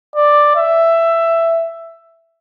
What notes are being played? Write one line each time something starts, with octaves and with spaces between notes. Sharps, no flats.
D5
E5